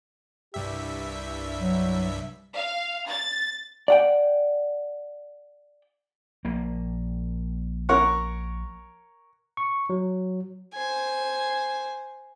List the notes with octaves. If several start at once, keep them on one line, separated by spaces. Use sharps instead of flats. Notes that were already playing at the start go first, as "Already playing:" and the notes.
C2 G2 G4 E5
F#3
F5
A6
D5 F#5 G5
A#1 A#3
A#4 C#5 F#5
C#6
F#3
C5 G#5